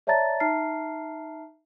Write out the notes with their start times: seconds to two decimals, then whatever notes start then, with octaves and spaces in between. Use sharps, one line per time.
0.07 C#5 D5 E5 A5 A#5 A6
0.40 D#4 E5 A5 A#5 F6 C7